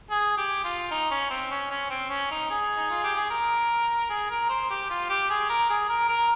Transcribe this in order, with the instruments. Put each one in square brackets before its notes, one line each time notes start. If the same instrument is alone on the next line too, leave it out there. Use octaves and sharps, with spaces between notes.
[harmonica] G#4
G4
F4
D#4
C#4
C4
C#4
C#4
C4
C#4
D#4
G#4
D#4
F4
G4
G#4
A#4
G#4
A#4
C5
G4
F4
G4
G#4
A#4
G#4
A#4
A#4